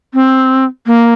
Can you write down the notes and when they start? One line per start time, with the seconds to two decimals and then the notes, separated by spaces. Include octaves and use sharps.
0.14 C4
0.86 A#3